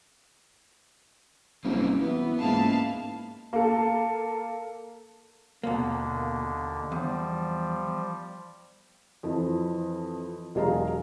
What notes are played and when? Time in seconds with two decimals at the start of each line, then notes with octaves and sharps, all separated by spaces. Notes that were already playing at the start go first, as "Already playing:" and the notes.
1.65 F#1 G3 A#3 C4
2.01 E3 B3
2.39 C#2 G#2 A#3 E4 F5 A5
3.53 A#3 A4
5.64 D#2 B2 D3 A#3
6.92 E2 F3 G3
9.23 F2 E3 F3
10.55 E1 F#3 G#4 D#5 F5 A#5